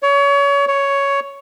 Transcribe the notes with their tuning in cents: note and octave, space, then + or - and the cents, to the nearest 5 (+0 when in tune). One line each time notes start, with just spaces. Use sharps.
C#5 +30
C#5 +10